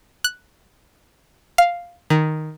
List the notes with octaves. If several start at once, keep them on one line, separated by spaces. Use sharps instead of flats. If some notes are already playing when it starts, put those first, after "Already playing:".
F#6
F5
D#3